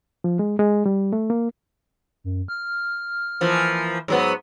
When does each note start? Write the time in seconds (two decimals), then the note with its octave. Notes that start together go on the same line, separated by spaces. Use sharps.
0.24 F3
0.39 G#3
0.59 G#3
0.86 G3
1.13 A3
1.30 A#3
2.24 F#2
2.48 F6
3.41 E3 F3 A#3
4.08 G#2 F#3 B3